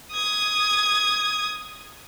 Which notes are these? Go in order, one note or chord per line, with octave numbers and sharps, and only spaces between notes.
D#6 G#6